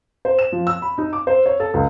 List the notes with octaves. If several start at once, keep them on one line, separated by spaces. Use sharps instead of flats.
C5
E7
F3
E6
B5
D#4
D6
C5
C#5
A4
C#2